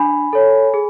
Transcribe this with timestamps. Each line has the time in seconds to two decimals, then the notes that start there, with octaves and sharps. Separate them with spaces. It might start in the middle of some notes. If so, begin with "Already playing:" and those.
Already playing: D4 G#5 B5
0.33 A4 C#5
0.74 G#4